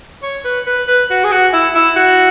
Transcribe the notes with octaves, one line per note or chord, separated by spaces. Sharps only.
C#5
B4
B4
B4
F#4
G#4
F#4
E4
E4
F#4